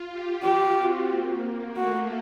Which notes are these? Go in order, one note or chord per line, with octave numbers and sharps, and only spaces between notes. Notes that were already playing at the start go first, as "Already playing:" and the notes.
Already playing: F4
G4
F#4 G4
C4
A#3
A#3
A3 F#4